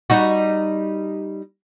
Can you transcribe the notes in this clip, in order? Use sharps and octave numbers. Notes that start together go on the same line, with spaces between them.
G3 D#4 F#4